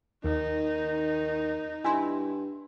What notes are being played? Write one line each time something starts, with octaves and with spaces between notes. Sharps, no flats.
D#2 D#3 D#4
G2 E4 G#5 C6